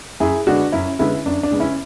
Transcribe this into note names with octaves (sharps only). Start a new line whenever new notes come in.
F#2 E4 G#4
D3 G#3 B3 D4 F#4
F#2 C#4 E4
D3 G#3 B3 C#4 E4
F#2 D4
D4
C#3 G#3 B3
C#4 E4